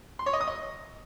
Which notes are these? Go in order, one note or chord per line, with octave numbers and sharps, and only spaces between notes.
C6
C#5
D#5
D#6
D#5